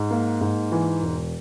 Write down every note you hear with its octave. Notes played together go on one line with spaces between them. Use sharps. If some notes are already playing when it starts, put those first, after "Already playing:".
Already playing: G#2
A#3
G#2
E3
E1